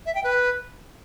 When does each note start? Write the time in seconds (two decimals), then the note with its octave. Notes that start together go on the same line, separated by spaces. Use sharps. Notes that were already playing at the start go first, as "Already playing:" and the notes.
0.06 E5
0.15 G5
0.24 B4